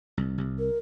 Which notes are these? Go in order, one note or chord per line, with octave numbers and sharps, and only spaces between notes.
C2
C2
A#4